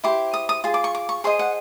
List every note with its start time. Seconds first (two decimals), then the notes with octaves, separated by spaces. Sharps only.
0.04 E4 G4 C5 D6
0.33 D#6
0.49 D#6
0.64 F4 G#4
0.74 D6
0.84 C#6
0.95 D6
1.09 C#6
1.24 G#4 C5 D#5 C6
1.39 F#5